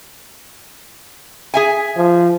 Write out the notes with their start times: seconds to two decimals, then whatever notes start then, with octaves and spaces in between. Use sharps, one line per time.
1.54 G#4 E5 G#5
1.97 F3